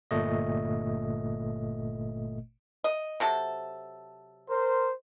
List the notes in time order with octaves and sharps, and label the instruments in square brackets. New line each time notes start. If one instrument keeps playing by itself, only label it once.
[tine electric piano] G1 A#2 A3 D#5
[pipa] D#5
C3 F#3 A4
[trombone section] A#4 C5